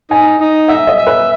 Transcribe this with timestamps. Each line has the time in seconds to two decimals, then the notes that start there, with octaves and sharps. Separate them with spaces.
0.10 D#4 G#5
0.40 D#4
0.68 E5 F#5
0.87 D#5
0.98 E5
1.07 B4